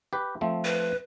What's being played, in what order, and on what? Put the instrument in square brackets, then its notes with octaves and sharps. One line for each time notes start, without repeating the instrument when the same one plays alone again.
[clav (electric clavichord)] G4 B4
F3 A3 C4
[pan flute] B4